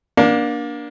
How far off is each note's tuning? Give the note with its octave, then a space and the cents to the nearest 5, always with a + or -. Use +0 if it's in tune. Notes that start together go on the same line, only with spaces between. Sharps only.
A#3 +30 D4 +0